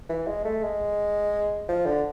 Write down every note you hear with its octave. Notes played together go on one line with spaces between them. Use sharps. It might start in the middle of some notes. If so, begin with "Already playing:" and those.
E3
G#3
A3
G#3
F3
D3